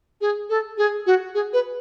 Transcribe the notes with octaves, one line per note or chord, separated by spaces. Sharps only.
G#4
A4
G#4
F#4
G#4
B4